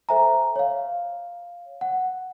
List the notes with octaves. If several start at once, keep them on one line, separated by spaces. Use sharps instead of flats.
A4 C5 E5 G#5 A#5
C#5 F5
F#5